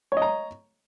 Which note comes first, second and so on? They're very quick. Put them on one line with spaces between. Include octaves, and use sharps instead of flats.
C#5 D#5 A#5